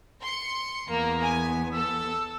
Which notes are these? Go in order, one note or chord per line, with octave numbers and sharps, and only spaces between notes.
C6 C#7
E2 A#3 B3
G#5
A4 E6